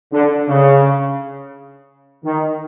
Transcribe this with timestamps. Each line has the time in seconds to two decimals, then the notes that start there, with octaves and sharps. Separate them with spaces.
0.12 D3
0.48 C#3
2.24 D#3